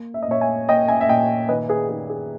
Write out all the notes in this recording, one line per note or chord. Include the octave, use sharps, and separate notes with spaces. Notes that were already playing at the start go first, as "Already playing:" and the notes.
Already playing: A#3
E5
D#5
A#2 C#5 E5
E5 G#5
A#3 D#5 G5
E5 G#5
E5
A#2 D#5 G5
D#3 B4 D#5
G#4 B4
D#3 G#4
G#4